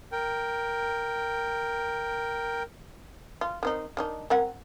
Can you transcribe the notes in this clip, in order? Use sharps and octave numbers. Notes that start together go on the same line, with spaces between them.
A#4 G5
F4
D#3 C4 D#4
D#3 D4 D#4
C4 A#4 F#5